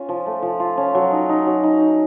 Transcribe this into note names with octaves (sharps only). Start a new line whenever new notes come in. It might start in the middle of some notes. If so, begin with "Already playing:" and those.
Already playing: C#4 F4
F3
A3
F3
F4
C#4
F#3
D#4
D#4
F#3
D#4
D#4